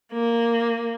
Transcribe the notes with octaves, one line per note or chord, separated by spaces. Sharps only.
A#3